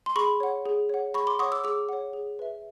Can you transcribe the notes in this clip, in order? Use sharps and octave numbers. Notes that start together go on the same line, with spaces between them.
C6
G#4 B5 C#6
C#5 F#5
G#4
C#5 F#5
G#4 B5 C#6
C6 D6
C#5 F#5 C#6 D#6
D6 E6
G#4 D6 E6
C#5 F#5
G#4
B4 E5